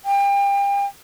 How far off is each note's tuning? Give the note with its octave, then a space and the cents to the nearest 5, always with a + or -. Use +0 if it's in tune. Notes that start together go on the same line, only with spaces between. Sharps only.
G5 +35